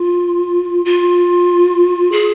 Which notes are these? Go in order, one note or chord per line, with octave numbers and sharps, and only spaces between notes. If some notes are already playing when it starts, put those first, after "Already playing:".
Already playing: F4
F4
G#4